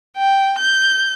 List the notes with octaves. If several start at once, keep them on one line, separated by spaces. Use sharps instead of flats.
G5
G6